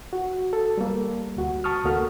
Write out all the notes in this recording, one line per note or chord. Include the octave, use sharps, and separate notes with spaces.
F#4
A4
G3 A#3
D2 F#4
A5 C#6 D#6 F6
D2 A#3 F#4 A4 F6